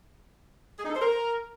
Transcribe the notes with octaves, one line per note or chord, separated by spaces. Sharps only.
G#4
D#4
A4
C5
A#4